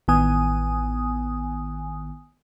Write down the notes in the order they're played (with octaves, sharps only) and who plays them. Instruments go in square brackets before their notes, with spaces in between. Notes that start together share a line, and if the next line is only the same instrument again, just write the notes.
[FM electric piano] A1 D#3 B3 G#5 D#6